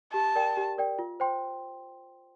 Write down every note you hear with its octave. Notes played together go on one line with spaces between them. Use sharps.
G4 A5
A#4 D5 G5
G4
A#4 D5 G5
F4
C5 G5 C6